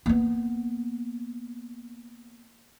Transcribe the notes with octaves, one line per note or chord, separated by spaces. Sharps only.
A#3 B3